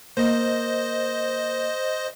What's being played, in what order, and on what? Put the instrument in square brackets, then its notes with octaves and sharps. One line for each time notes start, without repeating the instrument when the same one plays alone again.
[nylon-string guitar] A#3 [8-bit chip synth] C5 D#5